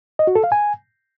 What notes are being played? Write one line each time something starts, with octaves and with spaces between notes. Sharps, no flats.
D#5
F#4
A4
F5
G#5